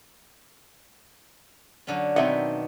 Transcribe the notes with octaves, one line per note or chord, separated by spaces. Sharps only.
F#2 D3 C#4
B2 D#3 C4 D4 E5 F#5